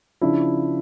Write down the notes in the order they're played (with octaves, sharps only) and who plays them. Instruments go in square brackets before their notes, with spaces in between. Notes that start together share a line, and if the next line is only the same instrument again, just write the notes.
[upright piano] C#3 F3 D4 E4